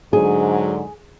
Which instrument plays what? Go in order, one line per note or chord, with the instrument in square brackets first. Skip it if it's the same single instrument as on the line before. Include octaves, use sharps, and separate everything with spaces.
[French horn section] G#2 D3 F#3 [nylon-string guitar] G#4